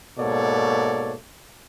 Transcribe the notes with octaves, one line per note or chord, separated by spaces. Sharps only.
G#2 B2 A#3 A4 C#5 D5